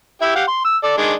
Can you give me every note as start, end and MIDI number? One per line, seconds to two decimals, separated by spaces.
0.22 0.34 64
0.22 0.34 67
0.22 0.34 76
0.35 0.44 67
0.35 0.44 77
0.35 0.44 78
0.48 0.61 84
0.65 0.77 88
0.83 0.95 69
0.83 0.95 74
0.97 1.13 51
0.97 1.13 56
0.97 1.13 62